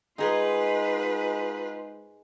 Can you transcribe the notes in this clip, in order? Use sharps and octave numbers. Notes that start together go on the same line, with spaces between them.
G#2 D#4 F4 G#4 B4 C6